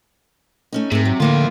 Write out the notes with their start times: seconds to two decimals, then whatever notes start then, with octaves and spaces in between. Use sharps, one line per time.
0.72 A3 C#4 D#4
0.92 G#2 C3 G#4 A#4
1.05 F#3
1.20 F2 A2 D3 A#3 E4 F4